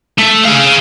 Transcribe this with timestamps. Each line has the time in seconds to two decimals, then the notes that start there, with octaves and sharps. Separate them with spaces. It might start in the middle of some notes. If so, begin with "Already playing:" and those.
0.18 A3
0.44 G#4 F5